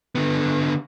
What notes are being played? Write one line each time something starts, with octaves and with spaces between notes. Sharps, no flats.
D3 B3